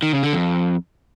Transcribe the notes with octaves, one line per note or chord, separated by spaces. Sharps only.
D#3
C#3
D3
F2